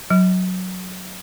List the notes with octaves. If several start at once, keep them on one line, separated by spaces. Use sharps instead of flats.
F#3